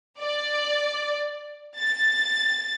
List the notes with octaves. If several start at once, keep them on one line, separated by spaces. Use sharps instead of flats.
D5
A6